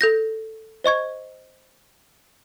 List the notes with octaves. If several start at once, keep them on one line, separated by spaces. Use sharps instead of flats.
A4 G6 A#6
C5 D#5 C#6 G#6